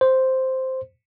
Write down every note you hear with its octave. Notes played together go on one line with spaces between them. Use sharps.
C5